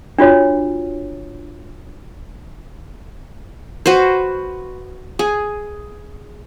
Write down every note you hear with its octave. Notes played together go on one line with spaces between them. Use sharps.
D4 F4 F#4 C#5
F#4 B4 C5
G#4